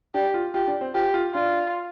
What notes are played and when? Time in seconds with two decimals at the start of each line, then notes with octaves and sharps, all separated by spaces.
0.14 D4 G4
0.34 F4
0.54 F4 G4
0.67 D4
0.81 C4
0.94 F4 G4
1.14 F4
1.34 D4 F4